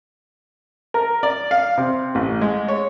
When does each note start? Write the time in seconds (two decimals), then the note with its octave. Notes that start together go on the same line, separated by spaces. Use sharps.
0.94 A#4
1.23 D5
1.51 F5
1.78 C3
2.15 A1
2.41 G#3
2.68 C#5